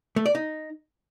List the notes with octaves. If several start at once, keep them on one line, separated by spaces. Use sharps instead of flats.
A3
D5
D#4